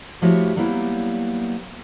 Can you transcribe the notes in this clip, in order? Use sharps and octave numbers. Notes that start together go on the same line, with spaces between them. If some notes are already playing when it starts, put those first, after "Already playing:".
F3 A3 E4 F#4 G4 C#5
F#3 G3 A#3 B3 E4